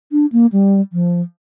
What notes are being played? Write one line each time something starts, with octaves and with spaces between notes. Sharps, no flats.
D4
A#3
G3
F3